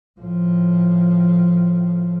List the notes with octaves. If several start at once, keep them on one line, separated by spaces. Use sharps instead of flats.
A2 F3